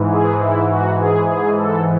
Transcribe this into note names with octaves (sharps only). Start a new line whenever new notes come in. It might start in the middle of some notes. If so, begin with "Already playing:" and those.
Already playing: G#2 E3
G#4
E4
F#4
G#4
G#4
A4